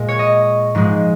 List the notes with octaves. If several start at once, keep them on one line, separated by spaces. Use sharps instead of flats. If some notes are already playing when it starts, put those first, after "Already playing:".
Already playing: A#2 G#3
C#5
D#5
G#2 F3 G#3